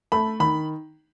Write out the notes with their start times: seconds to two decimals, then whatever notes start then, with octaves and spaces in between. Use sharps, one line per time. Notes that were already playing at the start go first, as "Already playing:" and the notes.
0.12 A3 B5
0.40 D#3 B5